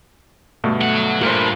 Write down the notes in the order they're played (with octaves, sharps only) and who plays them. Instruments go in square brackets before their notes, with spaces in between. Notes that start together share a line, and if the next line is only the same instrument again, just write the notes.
[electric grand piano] G2 B2 D3 [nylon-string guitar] A3
[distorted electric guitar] F#3 F#5
[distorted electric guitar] G2 [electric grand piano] A#2 F4 [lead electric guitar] A#4 C5